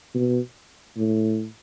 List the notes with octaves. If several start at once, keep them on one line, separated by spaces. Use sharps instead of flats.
B2
A2